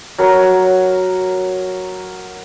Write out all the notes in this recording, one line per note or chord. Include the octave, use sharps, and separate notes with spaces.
F#3 A#4